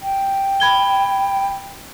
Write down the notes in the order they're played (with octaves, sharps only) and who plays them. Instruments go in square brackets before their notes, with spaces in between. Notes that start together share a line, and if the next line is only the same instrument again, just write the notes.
[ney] G5
[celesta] B5 G#6 G7